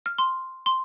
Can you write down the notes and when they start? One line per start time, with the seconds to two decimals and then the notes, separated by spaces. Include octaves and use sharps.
0.06 F6
0.18 C6
0.66 C6